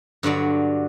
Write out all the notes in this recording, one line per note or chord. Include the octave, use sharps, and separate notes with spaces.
G2 D3 F#3 D5